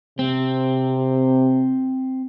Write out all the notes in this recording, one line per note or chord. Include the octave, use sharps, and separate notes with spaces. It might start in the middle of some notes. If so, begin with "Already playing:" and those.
C3 C4